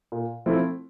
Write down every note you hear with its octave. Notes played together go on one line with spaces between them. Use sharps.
A#2
F3 A3 C4 E4